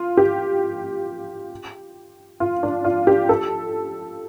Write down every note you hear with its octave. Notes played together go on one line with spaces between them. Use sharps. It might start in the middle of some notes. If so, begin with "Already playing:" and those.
Already playing: F4
G4
F4
D4
F4
G4
A4